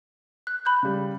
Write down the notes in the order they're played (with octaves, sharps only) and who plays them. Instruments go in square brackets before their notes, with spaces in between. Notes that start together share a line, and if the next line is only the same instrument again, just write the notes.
[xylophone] F#6
B5 F#6 G6
[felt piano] C#3 G3